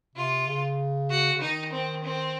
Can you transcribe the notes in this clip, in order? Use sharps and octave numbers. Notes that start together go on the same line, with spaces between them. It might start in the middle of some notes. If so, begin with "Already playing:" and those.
C3 F4
C#3
F#4
C#3
D#3 D#4
C4
C4